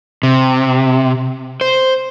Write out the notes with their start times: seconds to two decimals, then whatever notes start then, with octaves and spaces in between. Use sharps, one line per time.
0.23 C3
1.61 C5